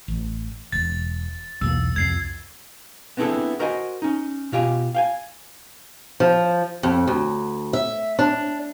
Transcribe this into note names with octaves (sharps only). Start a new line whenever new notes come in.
A1
E1 A6
B1 E2 A#3 E6
C2 F2 G#6 C7
B3 C4 D4 E4 G#4 A4
F#4 A#4 C5 D#5 F#5 G#5
C#4 D#4
B2 F4 G4 D5 G#5
F5 G5 G#5
F3
F2
D2
E5
D4